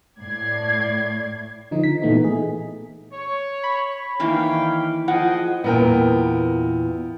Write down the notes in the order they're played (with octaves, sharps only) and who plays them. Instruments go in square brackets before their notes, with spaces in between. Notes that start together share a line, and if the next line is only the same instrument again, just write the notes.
[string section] A2 D5 G#6 C7
[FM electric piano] D3 F3 D#4
B6
A#2 E3 A3 B3 D#4
G#4
[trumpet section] C#5
[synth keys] B5
[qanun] D#3 E3 A#3 [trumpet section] C#5 F5 G5
[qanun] F3 [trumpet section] G#4 D#5 G5 [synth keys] F#5
[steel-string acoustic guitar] E2 A#2 E4 [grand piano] B3 A#4 G5